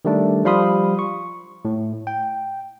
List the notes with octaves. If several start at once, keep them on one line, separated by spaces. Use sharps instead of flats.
D#3 G3 A3 D4
F3 G3 F5 B5 C6 D#6
C#6
A2
G5